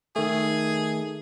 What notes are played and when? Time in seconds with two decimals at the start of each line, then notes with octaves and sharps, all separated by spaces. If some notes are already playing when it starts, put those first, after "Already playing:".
0.16 D#3 A3 G#4